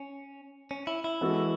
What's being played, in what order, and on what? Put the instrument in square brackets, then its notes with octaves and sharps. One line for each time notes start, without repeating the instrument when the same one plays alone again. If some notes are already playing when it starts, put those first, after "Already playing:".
Already playing: [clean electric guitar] C#4
C#4
E4
E4
[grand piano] E3 G#3 B3 F#4 A4